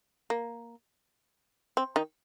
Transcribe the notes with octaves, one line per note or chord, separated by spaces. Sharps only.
A#3
C4
D#3 D#4